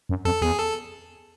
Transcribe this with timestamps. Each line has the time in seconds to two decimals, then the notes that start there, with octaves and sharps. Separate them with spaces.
0.09 F#2
0.25 F2 A4
0.42 E2 G#4
0.59 A4